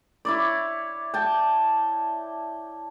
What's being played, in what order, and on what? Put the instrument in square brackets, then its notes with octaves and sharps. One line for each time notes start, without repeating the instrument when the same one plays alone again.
[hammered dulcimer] E4 C#5 D5
G5 A5